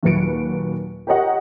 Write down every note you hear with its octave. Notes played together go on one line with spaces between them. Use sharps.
D#2 A#2 F#3 B4 C#7 D7
G4 A#4 C#5 D#5 F#5